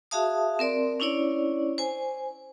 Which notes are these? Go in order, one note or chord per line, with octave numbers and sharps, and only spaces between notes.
F#4 G#4 E5 F5 A5 D#6
C4 A#4 D5 C6
C#4 D4 E4 C#5 D5
C5 G#5